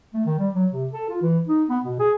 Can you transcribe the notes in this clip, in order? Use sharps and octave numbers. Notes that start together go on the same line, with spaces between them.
A3
D#3
G3
F#3
C3
A4
F4
E3
D#4
B3
B2
G#4